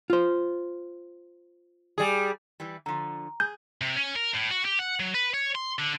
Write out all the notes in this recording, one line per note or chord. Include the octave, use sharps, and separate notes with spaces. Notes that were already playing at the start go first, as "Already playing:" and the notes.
F4 C5
G3 G#4
E3 G3
D3 F3 A#5
G#4 G6
C3
C#4
A#4
A2
F#4
G4
F#5
F#3
B4
C#5
C6
D3